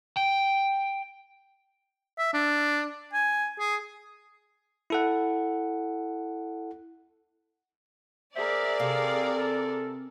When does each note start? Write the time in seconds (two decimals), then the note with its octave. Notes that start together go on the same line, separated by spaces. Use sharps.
0.17 G5
2.18 E5
2.34 D4
3.13 G#5
3.59 G#4
4.90 E4 A4 F#5
8.36 B3 G#4 A#4 C5 D5 E5
8.80 C3 G4 A4 F5
9.36 A4